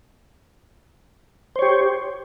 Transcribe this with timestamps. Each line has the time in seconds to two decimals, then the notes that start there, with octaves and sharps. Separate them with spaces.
1.56 C5
1.59 C#5
1.62 G4